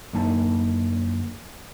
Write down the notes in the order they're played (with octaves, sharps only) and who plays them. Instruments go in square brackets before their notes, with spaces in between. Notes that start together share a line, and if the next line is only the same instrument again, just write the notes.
[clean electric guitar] F#2 D3 A#3 D#4 G#5 A5